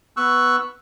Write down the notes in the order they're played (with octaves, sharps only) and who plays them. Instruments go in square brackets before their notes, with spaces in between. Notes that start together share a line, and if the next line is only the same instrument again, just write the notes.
[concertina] B3 C#6 E6 F#6